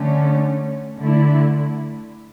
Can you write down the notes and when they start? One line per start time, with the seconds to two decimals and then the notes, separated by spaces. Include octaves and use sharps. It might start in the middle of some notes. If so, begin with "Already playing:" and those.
Already playing: D3 A3 C#4
0.99 D3 A3 E4